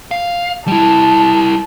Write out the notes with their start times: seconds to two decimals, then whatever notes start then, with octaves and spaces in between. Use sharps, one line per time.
0.11 F5
0.67 G3 E4 A5